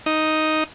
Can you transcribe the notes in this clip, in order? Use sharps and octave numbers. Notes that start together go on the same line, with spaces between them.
D#4